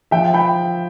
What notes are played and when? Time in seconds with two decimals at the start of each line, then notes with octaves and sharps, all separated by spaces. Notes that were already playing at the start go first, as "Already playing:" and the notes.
0.11 F3 E5 G5
0.34 G5 B5